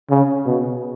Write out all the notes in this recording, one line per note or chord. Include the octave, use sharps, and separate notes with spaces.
C#3
B2